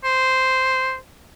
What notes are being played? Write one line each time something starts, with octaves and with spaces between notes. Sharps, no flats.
C5